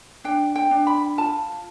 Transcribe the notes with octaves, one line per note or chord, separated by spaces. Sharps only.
D4 G5
G5
D4
B5
F4 A5